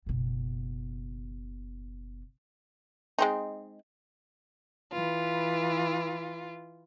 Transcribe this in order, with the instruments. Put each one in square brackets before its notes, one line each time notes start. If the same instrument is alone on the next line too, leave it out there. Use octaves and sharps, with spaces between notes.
[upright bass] F#1 B2
[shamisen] G#3 C4 D#4
[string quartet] E3 F4 B4